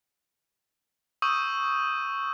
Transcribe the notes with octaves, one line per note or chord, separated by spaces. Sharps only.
C#6 D#6 E6 G6 D#7